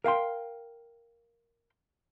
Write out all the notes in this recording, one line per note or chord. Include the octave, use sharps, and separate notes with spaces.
A#4 F5 G5 C6